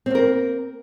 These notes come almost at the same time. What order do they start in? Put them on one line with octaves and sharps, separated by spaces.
C4 A#3 A#4